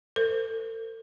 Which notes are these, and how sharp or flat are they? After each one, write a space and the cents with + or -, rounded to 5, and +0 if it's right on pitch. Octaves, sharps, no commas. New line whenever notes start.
A4 +40 C5 -45